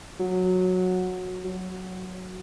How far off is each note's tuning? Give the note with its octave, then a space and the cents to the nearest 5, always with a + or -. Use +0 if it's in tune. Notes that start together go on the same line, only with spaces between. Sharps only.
F#3 -10
F#3 +0